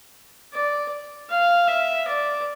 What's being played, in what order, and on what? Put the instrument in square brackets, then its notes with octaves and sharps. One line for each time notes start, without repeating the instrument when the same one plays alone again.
[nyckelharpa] D5
F5
E5
D5